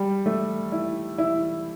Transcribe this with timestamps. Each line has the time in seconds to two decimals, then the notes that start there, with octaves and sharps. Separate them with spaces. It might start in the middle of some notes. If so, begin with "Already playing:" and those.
Already playing: G3
0.26 A3
0.72 E4
1.18 E4